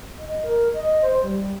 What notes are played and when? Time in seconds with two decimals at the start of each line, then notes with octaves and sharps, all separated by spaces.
0.18 D#5
0.43 A#4
0.74 D#5
1.02 C5
1.22 G3